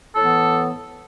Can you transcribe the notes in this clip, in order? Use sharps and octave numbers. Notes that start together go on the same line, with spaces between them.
A2 E3 B3 A4